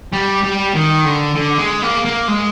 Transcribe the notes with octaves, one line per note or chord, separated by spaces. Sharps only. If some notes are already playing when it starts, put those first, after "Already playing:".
G3
G3
D#3
D3
D3
G#3
A#3
A#3
G#3